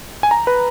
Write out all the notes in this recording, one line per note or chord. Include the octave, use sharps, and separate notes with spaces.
G#5
A#5
B4